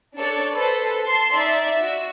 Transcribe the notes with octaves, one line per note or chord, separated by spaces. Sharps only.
D4 A4 C#5 D5
A4 B4 C5
A5 C6
D#4 D5 E5
F#4 E6